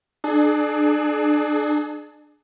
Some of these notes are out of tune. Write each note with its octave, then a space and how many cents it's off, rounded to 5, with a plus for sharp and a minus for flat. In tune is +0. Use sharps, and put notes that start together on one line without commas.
D4 +30 G#4 +35